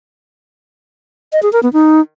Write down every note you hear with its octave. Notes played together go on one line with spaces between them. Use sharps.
D#5
G#4
A#4
B3
D#4